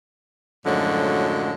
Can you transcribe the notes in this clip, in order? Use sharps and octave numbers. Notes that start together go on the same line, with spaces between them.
F#2 A2 D3 F3 F#3 G#3